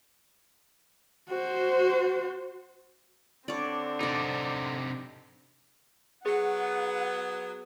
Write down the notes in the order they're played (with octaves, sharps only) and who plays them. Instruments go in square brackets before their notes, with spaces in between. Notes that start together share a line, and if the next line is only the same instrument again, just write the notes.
[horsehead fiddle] F#4 C5
[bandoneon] D3 [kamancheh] C4 D4 [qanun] C#5 D5
[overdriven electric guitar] C3 D#4 [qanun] C5 D5
[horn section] F#3 B3 [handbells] G#4 [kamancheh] F#5